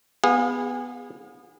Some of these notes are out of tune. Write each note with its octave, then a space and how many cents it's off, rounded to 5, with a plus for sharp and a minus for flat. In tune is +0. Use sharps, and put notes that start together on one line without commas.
B3 +0 G#4 -25 F5 +40